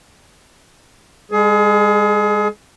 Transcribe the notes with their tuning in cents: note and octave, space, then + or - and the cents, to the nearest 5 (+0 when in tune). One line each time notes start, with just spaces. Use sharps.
G#3 -30 G#4 +30